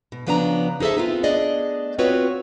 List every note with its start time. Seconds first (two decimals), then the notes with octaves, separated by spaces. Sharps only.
0.12 B2
0.27 C#3 F3 B3 D4 D#5 A#5
0.80 D#4 G#4 A4 C5 E5
0.97 B3 C4 F4
1.23 A3 B3 D4 G#4 D5 D#5
1.98 B3 C4 F4 F#4 B4 C#5